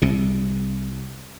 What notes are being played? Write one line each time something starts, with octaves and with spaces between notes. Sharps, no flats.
C2 C3